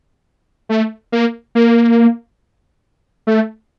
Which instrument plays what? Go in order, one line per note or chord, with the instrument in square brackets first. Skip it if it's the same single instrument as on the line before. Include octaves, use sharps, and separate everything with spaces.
[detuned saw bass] A3
A#3
A#3
A3